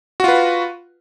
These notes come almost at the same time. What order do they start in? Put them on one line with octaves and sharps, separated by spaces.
F#4 F4 B4